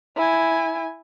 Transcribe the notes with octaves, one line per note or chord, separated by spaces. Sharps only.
E4 G#5